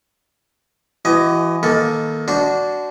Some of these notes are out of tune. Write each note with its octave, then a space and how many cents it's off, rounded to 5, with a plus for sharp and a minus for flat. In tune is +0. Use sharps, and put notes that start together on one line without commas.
E3 +25 F#4 +35 D#5 +0
D#3 +20 A#3 +15 A4 +0
D4 -10 F#4 +0 C5 -25